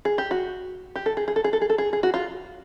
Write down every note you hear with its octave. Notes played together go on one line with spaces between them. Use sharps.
G#4
G4
F#4
G4
A4
G#4
G#4
A4
G#4
A4
G#4
A4
G#4
G#4
F#4
F4